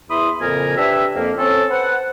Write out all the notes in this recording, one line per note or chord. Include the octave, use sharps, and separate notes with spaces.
E2 E4 B5 C6 D#6
F2 A#2 C#3 A#4 G#5
D4 G4 B4 E5
F2 A#3
C4 C#4 A4
B4 C5 F#5